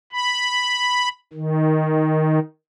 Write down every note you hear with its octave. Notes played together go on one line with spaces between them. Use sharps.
B5
D#3